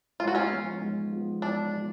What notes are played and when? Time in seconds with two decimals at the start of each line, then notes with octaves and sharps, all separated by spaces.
0.20 G#2 F4
0.28 F#4
0.35 C#4 F4
0.50 F3 B3
0.81 G#2
1.12 F3 B3
1.42 G#2 D4
1.72 F3 B3